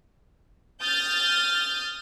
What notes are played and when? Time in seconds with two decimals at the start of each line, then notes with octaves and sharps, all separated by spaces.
0.82 D#6 F6 G6 A6